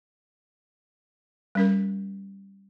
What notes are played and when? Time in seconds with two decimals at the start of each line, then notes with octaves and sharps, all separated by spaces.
1.55 G3 C#4 A#4